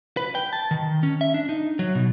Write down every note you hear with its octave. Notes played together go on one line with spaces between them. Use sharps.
B4
G5
A5
D#3
C#4
E5
D4
D#4
F#3
B2